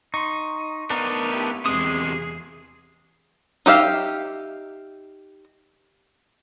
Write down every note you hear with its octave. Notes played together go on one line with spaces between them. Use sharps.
D#4 C6 C#6
B3 D4 D#4 A#4
E4 G4
E2 C3 G#3 G#4 D#6
D#4 G4 E5 F5